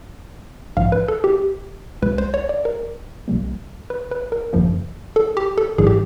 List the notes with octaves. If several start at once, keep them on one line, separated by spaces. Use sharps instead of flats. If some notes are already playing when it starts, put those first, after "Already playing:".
A#1 G#2 F3 F5
B4
A4
G4
C2 B2 G#3 B4
C5
C#5
D5
A#4
B1 B2 G3 A#3
B4
B4
A#4
G#1 F#2 C#3 F3 A#3
A4
G4
A4
G#1 G#2 E3 G3 G#4
G4